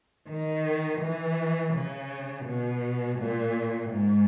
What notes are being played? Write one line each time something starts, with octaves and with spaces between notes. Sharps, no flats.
D#3
E3
C#3
B2
A#2
G#2